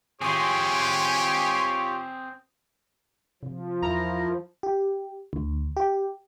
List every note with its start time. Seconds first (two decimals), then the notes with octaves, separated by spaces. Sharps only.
0.21 C4 F4 G4 G#4 C#5 G#5 C6 D6
3.43 C3 F3
3.82 E2 E4 A#4 A#5
4.63 G4
5.33 D2
5.77 G4